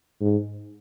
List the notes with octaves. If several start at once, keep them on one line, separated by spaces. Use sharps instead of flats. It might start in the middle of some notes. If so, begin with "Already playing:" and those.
G#2